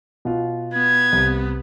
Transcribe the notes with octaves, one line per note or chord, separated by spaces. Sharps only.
B2 F4
B3 G#6
C2